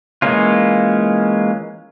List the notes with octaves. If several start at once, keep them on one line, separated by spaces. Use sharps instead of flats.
E3 G#3 A#3 C#4 F4